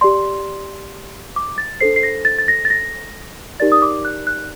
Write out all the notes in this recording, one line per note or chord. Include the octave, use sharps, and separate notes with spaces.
G4 D5 C6
D6
A6
D4 A4 C5 C7
C7
A#6
A6
A6
A#6
A6
A#6
D#4 G4 A#4 D5 A6
D#6
D6
F#6
F#6